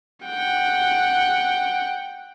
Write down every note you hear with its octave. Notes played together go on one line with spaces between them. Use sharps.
F#5 G5